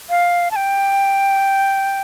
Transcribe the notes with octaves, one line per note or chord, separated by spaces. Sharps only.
F5
A5
G5